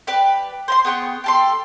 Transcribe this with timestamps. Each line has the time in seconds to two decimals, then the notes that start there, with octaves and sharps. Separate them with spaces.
0.07 G4 B4 D5 B5
0.68 C5 A#5 C6
0.85 B3 G#4 G5 C#6
1.24 G4 A4 C6